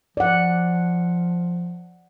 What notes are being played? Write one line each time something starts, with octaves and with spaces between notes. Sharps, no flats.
F3 D5 F#5